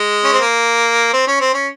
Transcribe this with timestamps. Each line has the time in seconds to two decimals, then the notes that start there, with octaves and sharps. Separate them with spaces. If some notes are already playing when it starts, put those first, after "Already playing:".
Already playing: G#3
0.24 C#4
0.33 C4
0.40 A#3
1.13 C4
1.27 C#4
1.40 C4
1.54 C#4